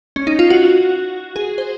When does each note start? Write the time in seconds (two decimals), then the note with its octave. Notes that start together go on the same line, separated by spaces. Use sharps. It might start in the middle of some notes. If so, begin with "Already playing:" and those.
0.16 C#4
0.27 D#4
0.39 F4
0.50 F#4
1.36 G#4
1.58 C5